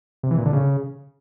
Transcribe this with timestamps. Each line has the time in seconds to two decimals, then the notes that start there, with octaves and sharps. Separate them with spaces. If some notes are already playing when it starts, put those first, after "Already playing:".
0.23 C3
0.31 E3
0.38 A#2
0.46 D3
0.53 C#3